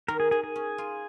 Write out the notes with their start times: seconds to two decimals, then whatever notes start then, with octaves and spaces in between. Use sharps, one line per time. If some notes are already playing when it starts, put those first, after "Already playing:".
0.08 D#3 A#4
0.20 G#4
0.31 D#3 G#4
0.44 G#4
0.56 C#4
0.78 F4